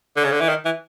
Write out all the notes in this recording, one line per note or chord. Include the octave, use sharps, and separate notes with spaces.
D3
C#3
D3
E3
D#3
E3